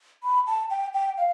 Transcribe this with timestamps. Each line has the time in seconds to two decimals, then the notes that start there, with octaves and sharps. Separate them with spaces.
0.23 B5
0.47 A5
0.70 G5
0.94 G5
1.18 F5